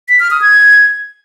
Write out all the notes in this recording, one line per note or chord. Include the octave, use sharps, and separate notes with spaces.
B6
F6
D#6
G#6